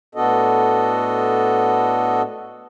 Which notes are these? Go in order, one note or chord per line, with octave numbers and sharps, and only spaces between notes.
A2 B3 D4 F#4 A4 D#5